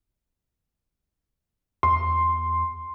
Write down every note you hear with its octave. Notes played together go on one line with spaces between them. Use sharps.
E2 C6